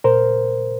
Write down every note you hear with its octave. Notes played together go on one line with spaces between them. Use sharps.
A#2 A#4 C5